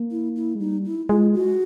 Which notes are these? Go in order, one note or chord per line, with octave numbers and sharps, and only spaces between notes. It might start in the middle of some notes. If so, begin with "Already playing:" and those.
Already playing: A#3
E4
E4
G#3
G3 D#4
E4
G#3 F4
F#4